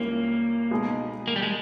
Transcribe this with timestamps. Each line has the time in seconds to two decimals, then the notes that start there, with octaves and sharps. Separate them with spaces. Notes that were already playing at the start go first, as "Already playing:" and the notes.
Already playing: C#2 C#3 G3 A#3 C#4 E4
0.71 B2 G#3 D#4 G#4
1.28 A#3
1.36 G3
1.42 G#3